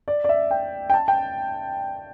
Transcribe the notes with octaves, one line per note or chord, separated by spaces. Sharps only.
D5
D5
E5
G5
G5
A5
G5